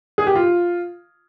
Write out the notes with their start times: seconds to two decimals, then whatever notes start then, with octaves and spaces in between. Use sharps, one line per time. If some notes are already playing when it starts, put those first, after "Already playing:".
0.18 G#4
0.27 G4
0.36 F4